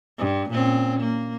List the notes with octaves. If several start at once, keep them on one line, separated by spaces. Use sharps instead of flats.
G2
A#2 C4 C#4
A#3